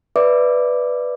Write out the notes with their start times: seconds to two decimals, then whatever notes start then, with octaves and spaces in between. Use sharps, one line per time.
0.16 B4 D5 E5 D6